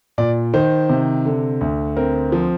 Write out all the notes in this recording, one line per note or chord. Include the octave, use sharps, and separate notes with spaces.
A#2 D5
D#3 C5
C3
D3
D2
C4 A#4
F3